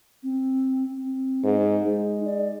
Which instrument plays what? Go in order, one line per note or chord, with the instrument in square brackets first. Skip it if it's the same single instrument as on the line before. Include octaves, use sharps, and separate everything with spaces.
[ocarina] C4
C4
[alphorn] G#2
[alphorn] G#3 [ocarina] D#4
[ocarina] D5